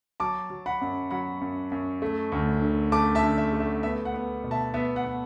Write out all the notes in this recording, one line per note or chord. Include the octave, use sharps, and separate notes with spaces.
F#3 A5 D6
F#3
F#5 B5
F#2
F#3 F#5 B5
F#2
F#2
A3
D2
D3
A3 A5 D6
E5 A5
D3
E5
A3
E5
B3 E5
F#5
B3
B2
E5 A5
B3 E5
F#5
B3